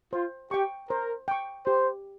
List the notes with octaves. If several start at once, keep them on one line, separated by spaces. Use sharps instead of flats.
F4 C5
G4 G5 C#6
A#4 C5
G5 C#6
G4 C5